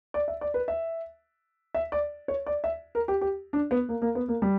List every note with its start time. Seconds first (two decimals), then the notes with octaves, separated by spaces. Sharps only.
0.14 D5
0.28 E5
0.41 D5
0.54 B4
0.68 E5
1.75 E5
1.92 D5
2.28 C#5
2.46 D5
2.64 E5
2.95 A#4
3.08 G4
3.21 G4
3.53 D4
3.71 B3
3.89 A#3
4.02 A#3
4.15 B3
4.28 A#3
4.42 G3